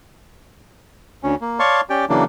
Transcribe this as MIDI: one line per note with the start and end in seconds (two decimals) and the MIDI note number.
1.23 1.35 38
1.23 1.35 61
1.41 1.59 58
1.59 1.81 73
1.59 1.81 74
1.59 1.81 77
1.59 1.81 81
1.59 1.81 84
1.59 1.81 85
1.90 2.05 61
1.90 2.05 67
1.90 2.05 74
1.90 2.05 79
2.10 2.24 49
2.10 2.24 52
2.10 2.24 54
2.10 2.24 58
2.10 2.24 62